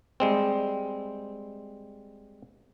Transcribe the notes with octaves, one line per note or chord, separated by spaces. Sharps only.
G3 G#3 C4